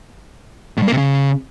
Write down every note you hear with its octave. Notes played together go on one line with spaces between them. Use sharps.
A2
G2
A#3
C3
C#3